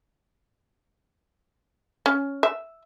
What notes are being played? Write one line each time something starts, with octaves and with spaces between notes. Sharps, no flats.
C#4
E5